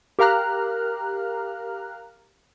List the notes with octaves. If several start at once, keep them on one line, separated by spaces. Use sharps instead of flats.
G4 A#4 F5 A#5 F6 F#6